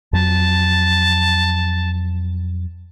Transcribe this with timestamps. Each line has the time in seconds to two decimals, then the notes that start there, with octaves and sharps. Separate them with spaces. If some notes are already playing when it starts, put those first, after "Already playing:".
0.13 F2 F#3 A5